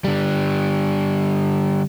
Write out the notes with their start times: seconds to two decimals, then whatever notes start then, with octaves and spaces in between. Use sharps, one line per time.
0.04 D3 G3